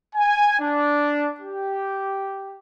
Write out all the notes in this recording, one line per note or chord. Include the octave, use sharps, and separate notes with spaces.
G#5
D4
G4